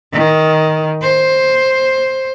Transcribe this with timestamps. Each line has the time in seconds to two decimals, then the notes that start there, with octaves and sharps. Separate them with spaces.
0.13 D#3
1.02 C5